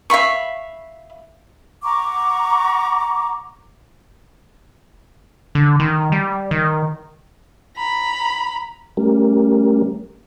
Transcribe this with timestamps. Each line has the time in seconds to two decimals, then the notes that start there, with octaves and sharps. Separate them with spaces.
0.10 E5 F5 B5 C#6
1.83 F#5 A#5 C#6 D6
5.55 D3
5.80 D#3
6.12 G3
6.51 D#3
7.77 A#5 B5
8.97 G3 A3 C#4 G4 A#4